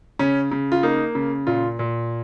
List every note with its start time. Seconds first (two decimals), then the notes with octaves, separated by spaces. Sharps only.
0.19 C#3 C#4
0.51 C#3
0.72 F4
0.83 A#3 D#4
1.15 C#3
1.47 A#2 F4
1.79 A#2